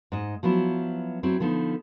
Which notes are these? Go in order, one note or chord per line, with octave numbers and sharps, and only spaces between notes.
G#2 D#5
F3 F#3 B3 E4
F#3 C4 E4
D3 F3 B3 D#4